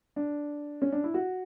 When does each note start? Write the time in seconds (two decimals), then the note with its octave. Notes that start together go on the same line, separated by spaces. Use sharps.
0.16 D4
0.82 C#4
0.92 D4
1.04 E4
1.14 F#4